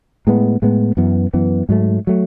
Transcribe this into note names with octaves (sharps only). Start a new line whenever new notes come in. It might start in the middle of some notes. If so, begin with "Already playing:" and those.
A2 G#3 B3
A2 G#3 B3
F#2 E3 B3
F#2 E3 B3
G#2 F#3 A3
F#3 A3